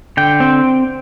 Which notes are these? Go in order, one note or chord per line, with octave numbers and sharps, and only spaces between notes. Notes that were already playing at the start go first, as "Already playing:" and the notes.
D3 G5
C4